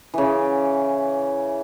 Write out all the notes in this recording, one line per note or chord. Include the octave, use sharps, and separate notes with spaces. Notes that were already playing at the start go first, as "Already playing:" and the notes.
C#3 E3